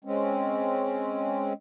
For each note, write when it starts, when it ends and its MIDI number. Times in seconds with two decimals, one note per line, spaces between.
0.05 1.53 56
0.05 1.53 60
0.05 1.53 61